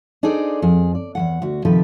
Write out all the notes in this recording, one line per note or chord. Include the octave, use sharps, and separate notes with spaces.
D4 D#4 G#4 A4 C5 D5
F2 G#4
D5
E2 D#3 F#5
D2 F#4
C3 D#3 F3 G4 A4 B4